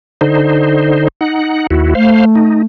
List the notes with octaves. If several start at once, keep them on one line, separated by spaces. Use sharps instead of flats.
D3 D#4 C5
D#4 F#5
D#2 E4 F#4
A3 C5 F5
D#4